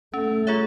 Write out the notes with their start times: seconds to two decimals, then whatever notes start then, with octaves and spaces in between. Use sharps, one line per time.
0.14 A3 C#4
0.47 F4 G#4 C#5 E5